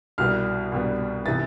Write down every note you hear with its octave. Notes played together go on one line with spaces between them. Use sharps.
C2 B2 G3 B3 F6
C2 B2 G3 B3
C3 E3 B3 A6